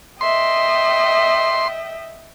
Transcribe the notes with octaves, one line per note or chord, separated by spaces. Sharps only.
D#5 E5 G5 C6